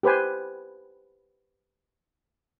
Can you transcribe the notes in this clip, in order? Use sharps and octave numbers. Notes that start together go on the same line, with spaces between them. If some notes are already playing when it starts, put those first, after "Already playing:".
G4 B4 C5 G#5